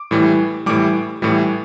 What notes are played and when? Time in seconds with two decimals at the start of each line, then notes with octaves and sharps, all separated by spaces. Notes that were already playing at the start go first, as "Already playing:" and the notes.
Already playing: D6
0.11 A2 E3 G3
0.66 A2 E3 G3 D6
1.22 A2 E3 G3